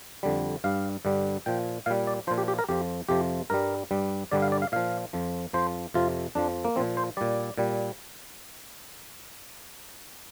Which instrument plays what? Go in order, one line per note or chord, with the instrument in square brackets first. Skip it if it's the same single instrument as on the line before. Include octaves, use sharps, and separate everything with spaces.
[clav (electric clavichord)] F2 D3 G3
G2 G3 F5
G2 D3 G3
A#2 F3 G5
A#2 G3 F5
D5
F3 C5
A#2
G4
G4
A#4
F2 F3 G4
F2 C3 F3 G4
G2 G3 A#4
G2 G3
G2 D3 G3 D5
F5
D5
F5
A#2 F3 F5
F2 F3
F2 F3 C5
F2 C3 F3 F4
F2 F3 D4
A#3
A#2 F3 C4
C5
A#2 G3 D5
A#2 G3